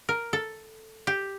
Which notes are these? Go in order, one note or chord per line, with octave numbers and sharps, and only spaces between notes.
A#4
A4
G4